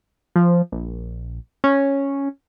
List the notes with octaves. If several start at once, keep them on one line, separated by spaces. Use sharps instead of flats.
F3
A#1
C#4